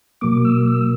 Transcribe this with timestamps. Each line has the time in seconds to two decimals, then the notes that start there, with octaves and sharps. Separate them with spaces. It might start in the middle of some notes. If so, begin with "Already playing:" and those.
0.21 B2 F#3 A#3 D6
0.45 E6
0.68 E6